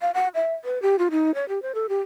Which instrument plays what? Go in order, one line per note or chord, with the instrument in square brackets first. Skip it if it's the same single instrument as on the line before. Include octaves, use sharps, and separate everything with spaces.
[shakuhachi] F5
F#5
E5
B4
G4
F4
D#4
C#5
G4
C5
A4
G4